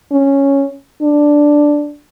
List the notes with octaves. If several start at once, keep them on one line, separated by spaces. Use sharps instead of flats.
C#4
D4